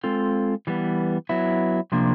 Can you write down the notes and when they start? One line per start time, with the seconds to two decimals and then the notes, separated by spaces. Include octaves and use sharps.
0.04 G#3 C4 F4 A4
0.67 E3 G3 B3
1.29 F#3 B3 E4
1.92 C3 F3 A#3 D4